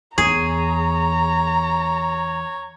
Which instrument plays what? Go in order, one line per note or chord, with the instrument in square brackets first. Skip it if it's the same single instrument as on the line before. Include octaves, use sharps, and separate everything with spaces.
[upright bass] E2 [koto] G#4 [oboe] C#5 [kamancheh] A#5